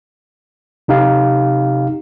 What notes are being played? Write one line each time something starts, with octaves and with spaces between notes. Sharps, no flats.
C3 D#4 G4 F5